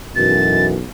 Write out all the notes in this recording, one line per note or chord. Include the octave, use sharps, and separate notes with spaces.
B1 F#2 B2 E3 A6